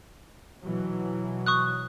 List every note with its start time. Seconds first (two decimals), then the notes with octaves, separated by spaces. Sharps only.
0.62 B2 E3 F#3
1.46 C#6 D#6 F#6